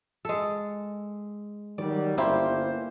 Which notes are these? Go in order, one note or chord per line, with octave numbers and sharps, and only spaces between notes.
G#3 A4
D#3 F#3 G3 D5
G1 A#3 C#4 E4 G4 C5